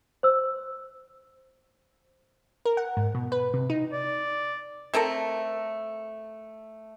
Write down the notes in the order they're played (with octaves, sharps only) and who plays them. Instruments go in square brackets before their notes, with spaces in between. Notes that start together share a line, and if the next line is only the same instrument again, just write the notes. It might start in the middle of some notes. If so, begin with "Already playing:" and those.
[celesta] C5 E6
[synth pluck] A#4
F#5
G#2
B2
B4
C3
D#4
[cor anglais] D5
[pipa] A3 C4 A4 A#4